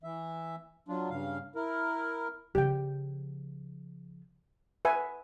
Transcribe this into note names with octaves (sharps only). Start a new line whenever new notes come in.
E3 E5
F#3 D4 F4
G2 C#3 F5
E4 A#4
C#3 F3 G4 G5
B4 E5 G#5